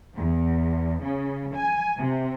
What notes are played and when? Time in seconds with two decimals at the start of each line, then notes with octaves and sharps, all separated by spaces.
0.17 E2
1.03 C#3
1.55 G#5
1.98 C3